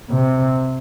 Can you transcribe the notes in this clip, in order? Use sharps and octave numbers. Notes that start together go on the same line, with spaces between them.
C3